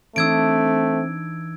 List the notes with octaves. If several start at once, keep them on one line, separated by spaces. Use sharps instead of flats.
E3 A3 C4 D4 D#4 E6 G#6 D7